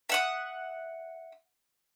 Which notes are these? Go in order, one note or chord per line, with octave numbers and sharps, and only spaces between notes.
E5 F#5 D#6